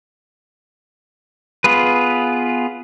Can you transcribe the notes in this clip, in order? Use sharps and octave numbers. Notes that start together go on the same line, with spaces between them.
B3 F4 G#4 B4